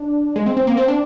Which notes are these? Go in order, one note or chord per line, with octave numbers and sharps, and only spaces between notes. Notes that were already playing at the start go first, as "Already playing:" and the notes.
Already playing: D4
G#3
C4
C4
A#3
C4
D4